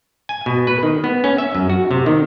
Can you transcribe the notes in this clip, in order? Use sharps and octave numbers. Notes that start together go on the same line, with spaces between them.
G#5
B2
B4
D#3
B3
C#4
E5
F#2
F#4
C3
D#3